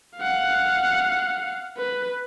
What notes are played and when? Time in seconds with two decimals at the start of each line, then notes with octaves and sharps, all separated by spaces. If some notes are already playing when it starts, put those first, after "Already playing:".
0.17 F5 F#5
1.77 B4